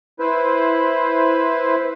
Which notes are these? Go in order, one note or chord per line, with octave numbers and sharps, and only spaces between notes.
E4 B4 C5